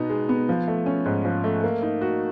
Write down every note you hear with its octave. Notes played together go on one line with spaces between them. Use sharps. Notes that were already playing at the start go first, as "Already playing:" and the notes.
Already playing: B2 B3 D#4
G#3
B3
F3
A3
C#4
G#2
F3
A3
A#3
D#4
F#4